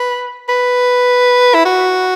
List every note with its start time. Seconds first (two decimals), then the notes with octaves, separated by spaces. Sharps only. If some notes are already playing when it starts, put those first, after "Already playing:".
Already playing: B4
0.49 B4
1.54 E4
1.65 F#4